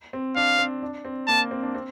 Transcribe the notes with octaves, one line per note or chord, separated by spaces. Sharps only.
C4
D4 F5
C4
D4
C4
A#3 A5
C4
D4
C4